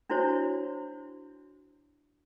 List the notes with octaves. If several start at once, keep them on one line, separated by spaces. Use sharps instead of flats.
D4 E4 F#4 C5 C#5